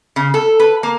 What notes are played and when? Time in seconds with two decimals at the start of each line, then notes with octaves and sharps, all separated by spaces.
0.16 C#3
0.34 A4
0.60 B4
0.83 A#3